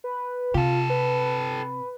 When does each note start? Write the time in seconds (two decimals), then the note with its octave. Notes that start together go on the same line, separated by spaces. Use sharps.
0.04 B4
0.54 C3 F4 G4 A4
0.90 B4